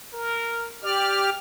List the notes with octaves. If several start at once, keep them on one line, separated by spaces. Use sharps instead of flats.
A#4
G4 D5 F6